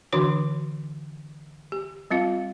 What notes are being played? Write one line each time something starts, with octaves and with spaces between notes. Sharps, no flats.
D3 E3 D4 F#4 C#5 D6
G4
G3 C4 F4 F5